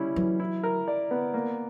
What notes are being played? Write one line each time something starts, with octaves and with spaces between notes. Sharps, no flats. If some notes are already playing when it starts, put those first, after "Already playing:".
Already playing: G3 C#4 E4
E3 F#3
E4
A#4
D5
B3
A#3